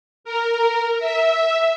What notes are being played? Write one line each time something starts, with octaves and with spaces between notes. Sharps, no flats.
A#4
E5